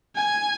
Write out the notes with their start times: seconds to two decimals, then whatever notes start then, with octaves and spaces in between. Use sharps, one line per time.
0.16 G#5